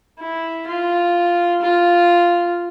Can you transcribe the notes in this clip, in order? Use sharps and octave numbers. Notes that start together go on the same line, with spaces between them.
E4
F4
F4